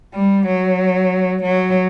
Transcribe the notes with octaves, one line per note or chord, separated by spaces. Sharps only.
G3
F#3
F#3